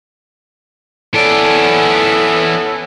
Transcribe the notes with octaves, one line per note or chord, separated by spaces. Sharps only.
E3 B3 C#4 A4 D5